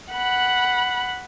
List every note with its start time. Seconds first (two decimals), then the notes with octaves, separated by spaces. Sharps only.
0.13 F#5 B5